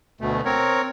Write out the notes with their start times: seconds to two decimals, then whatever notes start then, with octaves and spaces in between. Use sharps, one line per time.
0.21 D2 B2 A3
0.45 C4 A#4 C#5